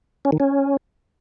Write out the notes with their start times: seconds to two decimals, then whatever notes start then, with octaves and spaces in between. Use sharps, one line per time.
0.25 C#4
0.32 D#3
0.40 C#4